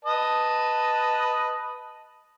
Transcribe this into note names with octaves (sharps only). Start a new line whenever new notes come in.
B4 D#5 A5